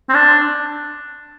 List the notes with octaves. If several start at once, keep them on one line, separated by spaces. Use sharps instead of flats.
C4
D4